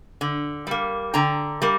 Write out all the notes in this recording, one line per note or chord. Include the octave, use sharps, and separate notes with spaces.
D3
G3 A#3
D3 G5 A#5
G3 A#3